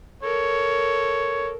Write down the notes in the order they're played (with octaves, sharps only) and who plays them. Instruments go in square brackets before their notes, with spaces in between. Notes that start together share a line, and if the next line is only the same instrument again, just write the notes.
[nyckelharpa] A4 A#4 [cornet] C#5